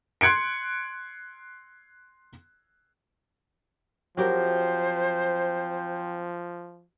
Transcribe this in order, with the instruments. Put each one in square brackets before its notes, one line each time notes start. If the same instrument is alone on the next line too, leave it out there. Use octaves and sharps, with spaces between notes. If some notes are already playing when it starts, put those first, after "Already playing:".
[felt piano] C6 F#6 G#6 C#7 D7
[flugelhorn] F3 [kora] F#3 G4 A#4 [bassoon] C4 [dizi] C5